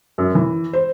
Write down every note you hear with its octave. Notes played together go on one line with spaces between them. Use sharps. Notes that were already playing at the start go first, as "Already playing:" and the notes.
F#2
E3
C5